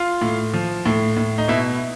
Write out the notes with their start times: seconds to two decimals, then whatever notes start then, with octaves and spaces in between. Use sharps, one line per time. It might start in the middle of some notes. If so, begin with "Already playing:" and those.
Already playing: F4
0.21 A2
0.54 F3
0.86 A2
1.17 A2
1.38 D#4
1.48 B2 E4